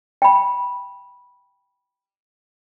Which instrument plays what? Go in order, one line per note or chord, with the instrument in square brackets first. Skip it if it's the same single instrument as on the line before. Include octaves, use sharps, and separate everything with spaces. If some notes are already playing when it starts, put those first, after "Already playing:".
[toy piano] G5 B5